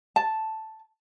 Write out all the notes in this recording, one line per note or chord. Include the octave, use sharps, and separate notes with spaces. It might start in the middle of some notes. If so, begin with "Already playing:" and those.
A5